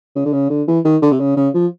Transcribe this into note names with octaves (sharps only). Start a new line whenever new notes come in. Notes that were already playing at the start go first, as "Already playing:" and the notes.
C#3
D3
C#3
D3
E3
D#3
D3
C3
C#3
C#3
F3